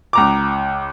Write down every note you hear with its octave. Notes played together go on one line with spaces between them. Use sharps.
C#2 A#5 D6